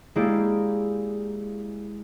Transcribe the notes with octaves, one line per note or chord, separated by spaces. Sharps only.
G#3 A#3 E4 G4 D5